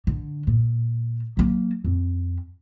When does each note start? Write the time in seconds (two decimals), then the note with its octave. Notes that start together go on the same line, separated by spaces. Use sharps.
0.07 D3
0.47 A#2
1.37 F#3 A#3
1.84 F2